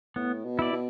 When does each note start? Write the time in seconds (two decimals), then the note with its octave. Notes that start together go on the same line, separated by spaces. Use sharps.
0.16 A2 B3
0.45 B2
0.59 E4 D5
0.73 B2